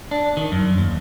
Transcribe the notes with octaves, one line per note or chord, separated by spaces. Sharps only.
D4
D#3
F#2
D#2